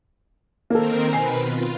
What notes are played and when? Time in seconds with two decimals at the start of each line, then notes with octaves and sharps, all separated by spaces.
0.70 D#3 A#3 C4 A4 A#4
1.13 B2 B4 G#5 B5 C7
1.45 F4